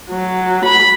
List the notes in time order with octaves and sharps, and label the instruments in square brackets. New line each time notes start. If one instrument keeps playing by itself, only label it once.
[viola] F#3
B5